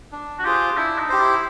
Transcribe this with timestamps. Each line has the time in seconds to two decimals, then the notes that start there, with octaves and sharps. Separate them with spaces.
0.12 D4
0.39 F#4
0.44 F4 G4 G#4 C5
0.76 D4 E4
0.98 D#4
1.09 G4 C5
1.20 E4